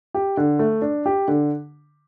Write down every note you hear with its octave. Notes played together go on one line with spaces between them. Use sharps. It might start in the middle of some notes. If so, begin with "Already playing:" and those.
G4
D3
A3
D4
G4
D3